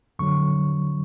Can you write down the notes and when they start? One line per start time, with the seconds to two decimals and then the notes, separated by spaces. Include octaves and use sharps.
0.19 F2 D3 F#3 C#6